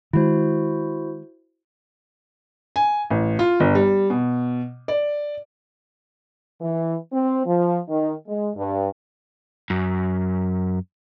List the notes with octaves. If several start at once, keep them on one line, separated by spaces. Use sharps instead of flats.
D#3 G#3 E4 F#4 C5
G#5
A1
F4
G1
G3
B2
D5
E3
C4
F3
D#3
G#3
G2
F#2